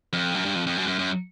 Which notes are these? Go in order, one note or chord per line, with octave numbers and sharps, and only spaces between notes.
F2
F#2
G2
F2
F2
F#2
F#2
F#2